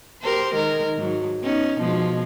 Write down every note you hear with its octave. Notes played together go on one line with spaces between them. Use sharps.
G4 A#4 C5
D#3 G#3 A#4
G#2 F#3
B3 C#4 D#4
B2 F3 G#3